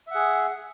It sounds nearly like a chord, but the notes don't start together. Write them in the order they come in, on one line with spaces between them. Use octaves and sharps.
E5 F#5 G#4